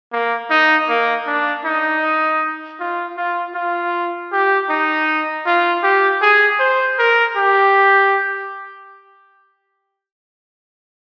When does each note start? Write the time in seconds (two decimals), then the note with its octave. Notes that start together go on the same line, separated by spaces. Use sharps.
0.13 A#3
0.51 D#4
0.89 A#3
1.27 D4
1.65 D#4
2.80 F4
3.17 F4
3.55 F4
4.32 G4
4.70 D#4
5.46 F4
5.83 G4
6.22 G#4
6.60 C5
6.99 A#4
7.37 G4